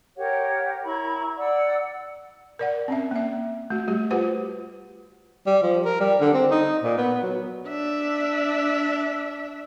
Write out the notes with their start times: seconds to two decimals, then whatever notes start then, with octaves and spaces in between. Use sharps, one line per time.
0.17 G4 A#4 C#5 F#5
0.85 E4 A#5 B5 C#6
1.37 D5 F#5 E6
2.59 A#4 D5 F#5
2.88 C4 C#4 E5
3.11 A#3 E5
3.70 A3 F#4
3.88 G3 F#4 G4
4.11 F4 G4 B4 C5 F#5
5.47 G3
5.63 F3
5.85 A#4
6.00 G3
6.21 D3
6.34 C4
6.51 D#4
6.83 A#2
6.98 B3
7.22 F#3
7.68 D4 E5